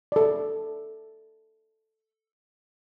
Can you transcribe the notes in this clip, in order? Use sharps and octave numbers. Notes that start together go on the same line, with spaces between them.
A4 D5